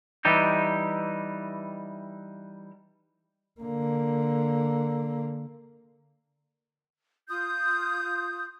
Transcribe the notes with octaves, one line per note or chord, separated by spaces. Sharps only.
E3 G3 D#4 G4
D3 A#3
F4 D#6 G6